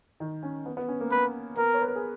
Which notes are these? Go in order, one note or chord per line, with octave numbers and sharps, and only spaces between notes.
D#3
C#4
B3
B3
C#4
A#3
A#3 B4
B3 A#4
C#5
B4
A#4
G#4